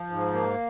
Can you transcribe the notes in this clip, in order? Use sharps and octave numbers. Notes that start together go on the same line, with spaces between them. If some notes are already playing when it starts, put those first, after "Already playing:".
Already playing: F3
G#2
A#3